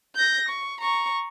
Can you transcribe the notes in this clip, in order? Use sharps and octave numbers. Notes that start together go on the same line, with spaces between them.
G6 A#6
C#6
A#5 C#6